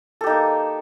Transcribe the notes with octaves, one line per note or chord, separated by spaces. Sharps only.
A#3 D#4 G4 A4